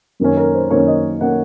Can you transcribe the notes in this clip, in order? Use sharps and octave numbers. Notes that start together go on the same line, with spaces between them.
F#2 D#3 A#3 C#4
A#4
C5
F#2 D#3 A#3 C#4 C#5
D#5
D#3 A#3 C#4 F#5